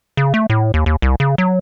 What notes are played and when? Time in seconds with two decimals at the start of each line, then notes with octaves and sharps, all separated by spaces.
0.17 C#3
0.34 A3
0.50 A2
0.74 D#2
0.86 D#2
1.02 C2
1.20 C#3
1.38 F#3